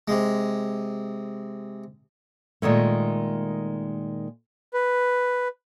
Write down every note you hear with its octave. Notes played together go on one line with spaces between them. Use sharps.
C3 G#3
A#2 D#3 G#3 A3
B4